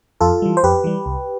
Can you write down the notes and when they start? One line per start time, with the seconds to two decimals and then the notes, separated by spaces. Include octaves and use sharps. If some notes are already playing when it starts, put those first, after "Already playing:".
0.21 F2 F4 A4
0.42 E3 G3
0.57 C5
0.63 F2 G4 B4
0.84 E3 G3
1.06 C2